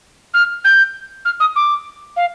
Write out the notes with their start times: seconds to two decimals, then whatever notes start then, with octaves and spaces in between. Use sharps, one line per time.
0.34 F6
0.64 G6
1.25 F6
1.40 D#6
1.56 D6
2.16 F5